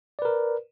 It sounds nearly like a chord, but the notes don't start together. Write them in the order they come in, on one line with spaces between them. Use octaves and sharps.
D5 B4 A#4